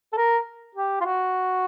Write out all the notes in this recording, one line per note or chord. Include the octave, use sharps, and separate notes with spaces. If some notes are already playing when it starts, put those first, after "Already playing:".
A4
A#4
G4
F4
F#4